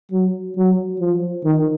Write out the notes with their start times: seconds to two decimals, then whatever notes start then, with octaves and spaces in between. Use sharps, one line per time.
0.12 F#3
0.57 F#3
1.00 F3
1.45 D#3